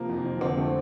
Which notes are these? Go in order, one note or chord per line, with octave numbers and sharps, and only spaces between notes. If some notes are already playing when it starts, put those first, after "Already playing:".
Already playing: C3 F3 A#3
F2
F2
D3 C4
A3